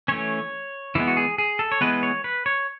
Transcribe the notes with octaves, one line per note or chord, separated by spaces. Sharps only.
E3 A3 C#4 C#5
E3 G#3 B3 E4
F#4
G#4
G#4
A4
C#5
E3 G#3 B3 B4
C#5
B4
C#5